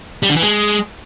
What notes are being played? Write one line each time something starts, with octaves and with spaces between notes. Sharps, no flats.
G3
D3
E3
G#3